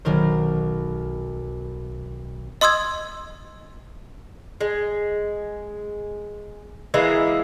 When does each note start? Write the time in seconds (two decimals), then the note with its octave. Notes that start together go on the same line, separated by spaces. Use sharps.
0.05 B1 D#3 A#4 C5
2.61 D#5 C6 D#6 E6 G#6
4.61 G#3
6.94 E3 G#3 A#3 E4